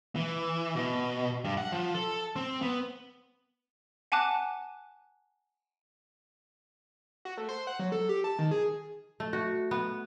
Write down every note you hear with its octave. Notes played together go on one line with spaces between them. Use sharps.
E3
B2
G2
F#5
F3
A4
C4
B3
F#5 G#5 A5 D6 F#6
F#4
A3
C5
F#5
F#3
A4
G4
A5
D#3
G#4
A3
F#4
B3